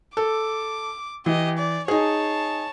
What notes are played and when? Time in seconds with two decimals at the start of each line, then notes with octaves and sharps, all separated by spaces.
0.17 A4 D6
1.26 E3 G4 D#5
1.58 D5
1.88 D#4 G#4 C#5 A5